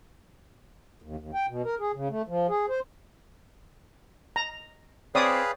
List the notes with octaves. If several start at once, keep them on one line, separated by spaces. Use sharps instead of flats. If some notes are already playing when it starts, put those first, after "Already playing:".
D#2
D#2
G5
B2
A#4
G#4
C#3
A3
F3
G#4
C5
A#5
C4 G#4 B4 C#5 D5 F5 D#6